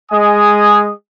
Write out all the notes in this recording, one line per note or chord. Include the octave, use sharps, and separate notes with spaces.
G#3 G#4 D#5 G#5 D#6